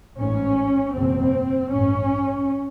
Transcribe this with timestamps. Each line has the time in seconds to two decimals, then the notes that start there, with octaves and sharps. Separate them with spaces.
0.19 A1 G#2 C#4
0.95 F#1 E2 B2 C4
1.71 A1 G2 C#4